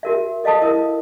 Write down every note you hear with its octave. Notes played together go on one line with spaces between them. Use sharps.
F#4 A#4 E5
A4 D#5 F5 A5 D#6
E4 A#4 D#6